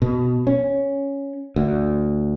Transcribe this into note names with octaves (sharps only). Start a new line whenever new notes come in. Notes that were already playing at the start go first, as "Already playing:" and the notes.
B2
C#4
D2